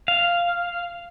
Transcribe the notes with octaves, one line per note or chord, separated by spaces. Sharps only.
F5